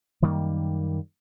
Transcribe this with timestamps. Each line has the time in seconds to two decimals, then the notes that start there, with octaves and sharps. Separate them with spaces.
0.22 F#2 D#3 G3 A#3